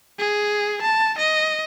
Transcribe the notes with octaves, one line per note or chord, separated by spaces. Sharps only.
G#4
A5
D#5